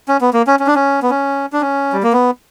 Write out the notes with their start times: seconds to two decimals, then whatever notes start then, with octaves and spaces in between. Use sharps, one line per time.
0.08 C#4
0.21 B3
0.33 A#3
0.47 C#4
0.60 C#4
0.67 D4
0.75 C#4
1.02 B3
1.10 C#4
1.53 D4
1.61 C#4
1.93 G3
2.03 A#3
2.13 B3